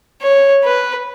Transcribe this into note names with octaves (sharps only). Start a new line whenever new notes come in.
C#5
B4